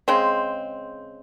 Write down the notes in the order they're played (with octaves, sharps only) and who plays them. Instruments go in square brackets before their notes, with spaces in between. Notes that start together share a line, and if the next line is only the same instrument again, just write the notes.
[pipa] C#3 G#3 C4